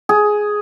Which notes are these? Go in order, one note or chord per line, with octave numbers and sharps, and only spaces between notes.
G#4